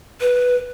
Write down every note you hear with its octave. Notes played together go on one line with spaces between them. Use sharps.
B4